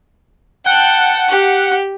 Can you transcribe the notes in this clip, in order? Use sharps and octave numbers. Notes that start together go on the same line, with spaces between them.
F#5 G5 A5
G4